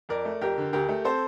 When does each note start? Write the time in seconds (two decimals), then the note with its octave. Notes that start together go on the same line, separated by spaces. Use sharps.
0.09 F2 A#4 D5
0.25 A3
0.41 F2 G4 A#4
0.58 D3
0.73 D2 G4 A#4
0.89 A3
1.05 C4 A4 C5